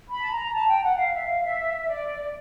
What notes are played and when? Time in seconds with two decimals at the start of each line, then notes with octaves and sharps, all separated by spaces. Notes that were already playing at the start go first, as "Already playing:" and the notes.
0.09 B5
0.21 A5
0.31 A#5
0.54 A5
0.68 G5
0.83 F#5
0.97 F5
1.13 E5
1.28 F5
1.43 E5
1.87 D5